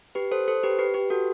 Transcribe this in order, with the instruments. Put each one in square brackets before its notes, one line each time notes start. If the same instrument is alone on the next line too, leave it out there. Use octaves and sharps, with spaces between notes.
[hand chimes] G4 B4
A4 C5
A4 C5
G4 B4
G4 B4
G4 B4
F#4 A4